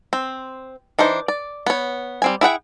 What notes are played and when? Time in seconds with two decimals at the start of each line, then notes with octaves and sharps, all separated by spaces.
0.13 C4
0.99 E3 D4 D#4 C5
1.28 D5
1.66 B3 C#5
2.22 G3 C4 G#5
2.41 E4 G#4 F#5 G5